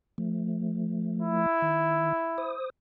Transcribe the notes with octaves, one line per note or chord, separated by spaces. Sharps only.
F3 A3
E4
D#3
C5 D#6